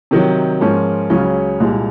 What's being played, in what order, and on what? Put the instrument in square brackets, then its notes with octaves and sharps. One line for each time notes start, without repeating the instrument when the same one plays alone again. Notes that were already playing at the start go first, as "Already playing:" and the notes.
[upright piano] C3 D#3 F#3
G#2 F3 A#3 C#4
C#2 C#3 F#3 C#4
C2 A#2 G#3